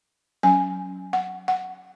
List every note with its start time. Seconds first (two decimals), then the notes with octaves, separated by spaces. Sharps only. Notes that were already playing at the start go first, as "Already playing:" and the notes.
0.43 F#3 C#4 G#5
1.13 F#5
1.48 F#5